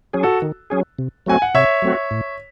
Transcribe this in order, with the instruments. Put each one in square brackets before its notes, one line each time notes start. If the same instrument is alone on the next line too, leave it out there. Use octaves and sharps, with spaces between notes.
[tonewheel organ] F#3 C#4 G#4
[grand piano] F#4 A4
[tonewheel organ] D#3
F#3 C#4 G#4
C3
[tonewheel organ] F#3 A3 C4 F#4 [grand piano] G#5
[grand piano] F#5
[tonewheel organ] C3 [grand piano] C#5 E5
[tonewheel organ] F#3 A3 C4 F#4
A2